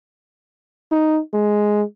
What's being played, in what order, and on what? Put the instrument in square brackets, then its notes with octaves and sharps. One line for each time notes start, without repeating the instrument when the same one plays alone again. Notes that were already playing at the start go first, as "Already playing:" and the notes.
[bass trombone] D#4
G#3